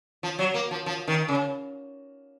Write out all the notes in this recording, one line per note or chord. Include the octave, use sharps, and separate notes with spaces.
F3
F#3
A#3
F3
F3
D#3
C#3